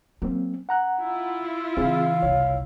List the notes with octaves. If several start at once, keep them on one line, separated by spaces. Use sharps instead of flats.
F#3 A#3 C4 C#4
F#5 A#5 F#6
E4 F4
C#3 E3 C4 G#4 F5
F#1 C2 C#5